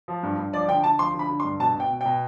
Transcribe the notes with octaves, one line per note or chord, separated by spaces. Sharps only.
F3
G2
G2
F3 D5
D3 G5
D3 A5
F3 C6
D3
B5
D3
C6
G2
B2 A5
B2
G5
B2
B2 G5